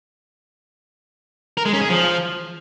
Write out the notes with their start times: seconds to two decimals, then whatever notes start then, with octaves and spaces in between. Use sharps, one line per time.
1.57 A#4
1.65 G#3
1.73 C#4
1.81 G#4
1.89 F3